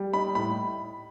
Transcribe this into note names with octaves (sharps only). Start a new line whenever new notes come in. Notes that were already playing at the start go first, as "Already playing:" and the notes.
Already playing: G3
D#4 B5
A2 B5